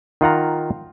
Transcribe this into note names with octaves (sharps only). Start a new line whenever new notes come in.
D#3 F4 F#5 A#5